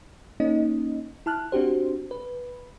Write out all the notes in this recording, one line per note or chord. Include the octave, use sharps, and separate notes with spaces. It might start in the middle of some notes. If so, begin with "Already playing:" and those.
A#3 C#4 D#4 D#5
E4 A5 F6 F#6
C4 D4 F#4 G4 C5
B4